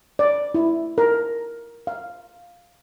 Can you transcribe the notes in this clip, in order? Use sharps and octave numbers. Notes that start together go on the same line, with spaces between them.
D5
E4
A#4
F5